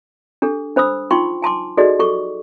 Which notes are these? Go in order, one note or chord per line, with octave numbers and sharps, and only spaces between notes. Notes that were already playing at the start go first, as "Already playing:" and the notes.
D4 G4 A4
D4 C5 B5 D#6 E6
D#4 F4 G5 C6 C#6
G#5 A5 C6 D6
D#4 F#4 G#4 A4 D5 D#5
G4 A4 C#6 D6